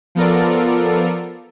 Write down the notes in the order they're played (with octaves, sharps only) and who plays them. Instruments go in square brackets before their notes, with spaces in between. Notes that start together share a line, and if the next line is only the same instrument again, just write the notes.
[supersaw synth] F3 B3 F4 A4 A#4 D5